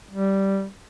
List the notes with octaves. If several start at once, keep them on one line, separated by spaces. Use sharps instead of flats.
G3